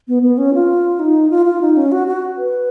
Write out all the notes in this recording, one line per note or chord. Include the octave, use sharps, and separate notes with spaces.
B3
B3
C#4
F4
D#4
F4
F4
D#4
C#4
F#4
F#4
B4